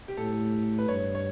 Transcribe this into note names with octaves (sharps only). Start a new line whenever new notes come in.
G4
A2 A4
B4
G2 C#5
C#5